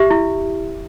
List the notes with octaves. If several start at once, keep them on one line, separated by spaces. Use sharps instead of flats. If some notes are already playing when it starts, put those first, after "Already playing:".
Already playing: G4 E5
E4